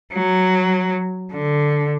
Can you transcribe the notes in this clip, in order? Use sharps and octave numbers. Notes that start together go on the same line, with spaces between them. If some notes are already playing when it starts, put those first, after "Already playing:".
F#3
D3